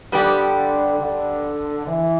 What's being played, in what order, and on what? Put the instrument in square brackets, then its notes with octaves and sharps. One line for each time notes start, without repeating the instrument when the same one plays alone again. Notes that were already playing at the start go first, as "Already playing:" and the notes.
[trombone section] D3 [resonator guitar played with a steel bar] G3 B3 G4
[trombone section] D3
E3